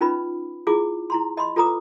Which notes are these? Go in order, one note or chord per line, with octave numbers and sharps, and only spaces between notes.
C#4 D#4 F4 B4 B5
E4 F4 G#4 D6
E4 A#5 C6
D#5 B5 C6
F4 A4 B4 A#5 D6 D#6